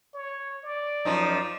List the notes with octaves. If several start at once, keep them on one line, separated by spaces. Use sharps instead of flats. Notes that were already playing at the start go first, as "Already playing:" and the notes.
C#5
D5
F#2 F3 D#4